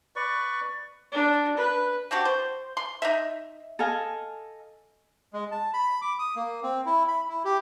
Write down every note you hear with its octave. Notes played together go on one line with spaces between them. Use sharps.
B4 D5 C#6
D4
B4
C4 D4 F#4 G4
C5
C6
D#4 D#5 E5
A4 D#5 F5 G#5
G#3
A5
B5
D6
D#6
A#3
C4
E4
B5
E4
G4